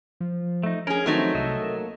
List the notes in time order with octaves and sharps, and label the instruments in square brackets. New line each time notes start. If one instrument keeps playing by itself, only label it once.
[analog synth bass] F3
[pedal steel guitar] A3 D#4
[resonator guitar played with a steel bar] C#4 G#4 [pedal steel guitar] A#4
[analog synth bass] D#3 [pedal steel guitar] F3 C4 A#5 [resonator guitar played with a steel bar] F#3 A3 D#4
[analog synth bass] C2 [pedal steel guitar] A4 D#5 E5
[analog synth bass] A#3